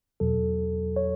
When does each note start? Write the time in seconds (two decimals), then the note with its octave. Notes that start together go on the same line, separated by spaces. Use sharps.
0.20 E2 B2 F#3 A4
0.96 C#5